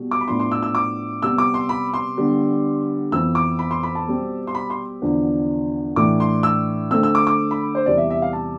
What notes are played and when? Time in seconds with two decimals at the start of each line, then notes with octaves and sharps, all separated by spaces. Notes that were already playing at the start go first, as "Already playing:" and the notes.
Already playing: B2 G3
0.11 D6
0.21 B5
0.27 A2 F3 B3 D4 C6
0.40 C6
0.51 E6
0.63 E6
0.75 D6
1.22 C3 G3 B3 E6
1.38 D6
1.54 C6
1.69 B5
1.94 C6
2.17 D3 G3 B3
3.12 F2 E3 B3 E6
3.35 D6
3.59 B5
3.71 C6
3.83 B5
3.95 A5
4.07 B2 G3 C4
4.47 C6
4.55 B5
4.70 C6
5.02 E2 D3 F3 B3 D4
5.96 A2 E3 A3 D4 D6
6.20 C6
6.43 E6
6.91 D3 A3 C4 E6
7.03 E6
7.15 D6
7.27 D6
7.51 B5
7.75 C5
7.86 E2 C3 E3 G3 D5
7.98 E5
8.10 E5
8.22 F5
8.33 A5